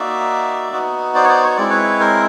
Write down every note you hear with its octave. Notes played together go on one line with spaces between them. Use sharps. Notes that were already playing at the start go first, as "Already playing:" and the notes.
Already playing: A#3 D#4 F#4 D5 E5
B3 D#4 F#4
C5 D5
C#5
C5 D5
C#5
G#3 C4 E4 D5
B4 C#5
A#4 C5